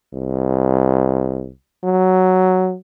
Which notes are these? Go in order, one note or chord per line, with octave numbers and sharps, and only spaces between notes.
C2
F#3